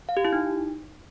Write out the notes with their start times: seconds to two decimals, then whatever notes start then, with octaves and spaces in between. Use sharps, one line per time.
0.09 F5
0.17 G4
0.25 E4
0.33 D#4